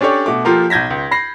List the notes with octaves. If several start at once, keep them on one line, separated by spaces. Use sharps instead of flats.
C#4 D4 G4 A4 C#5 D5
B2 A3 D6
F3 A#3 F4 G4 A4 A#4
B1 G6 G#6 A#6 B6
C#2
B5 A#6 C7